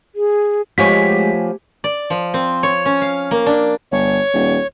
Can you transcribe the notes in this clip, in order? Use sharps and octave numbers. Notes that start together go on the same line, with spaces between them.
G#4
F3 G#3 A3 B3 G4 C#5 G#5 B6
D5
F3
C4
C#5
C#4
F5
A#3
D4
G1 C#5
D#1